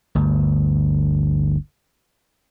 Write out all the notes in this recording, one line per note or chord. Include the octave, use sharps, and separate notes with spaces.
G1 D2